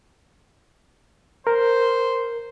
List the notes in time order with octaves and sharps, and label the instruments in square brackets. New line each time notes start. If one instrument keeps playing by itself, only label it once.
[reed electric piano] A#4 [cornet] C5